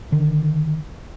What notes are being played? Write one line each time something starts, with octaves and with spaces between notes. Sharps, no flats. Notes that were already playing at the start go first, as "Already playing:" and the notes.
D3 D#3